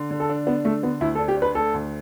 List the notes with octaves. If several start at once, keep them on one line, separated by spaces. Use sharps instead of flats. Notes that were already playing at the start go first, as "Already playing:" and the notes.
Already playing: D3
D3
A4
D4
B3 D4
A3 D4
D3 B3
D2 E4
A4
D4
G4
D4 B4
A3 A4
D2